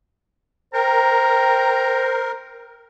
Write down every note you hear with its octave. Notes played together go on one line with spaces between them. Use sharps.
A#4 C5 G5 A#5